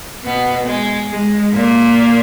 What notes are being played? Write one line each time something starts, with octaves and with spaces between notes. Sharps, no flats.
B2 B3
G#3
G#3
A#2 A#3